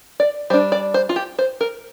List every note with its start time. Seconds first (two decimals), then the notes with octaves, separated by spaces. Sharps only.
0.20 D5
0.50 G3 C5
0.53 D4
0.72 D5
0.94 C5
1.09 F4
1.16 G4
1.39 C5
1.61 A#4